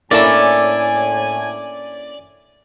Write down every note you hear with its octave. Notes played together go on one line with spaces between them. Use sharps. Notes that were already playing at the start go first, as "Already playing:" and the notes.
A2 A#3 C#4 D4 E4 A4 D5 G#5